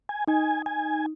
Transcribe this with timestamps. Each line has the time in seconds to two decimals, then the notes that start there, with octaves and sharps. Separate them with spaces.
0.09 G#5
0.28 D#4 G#5
0.66 G#5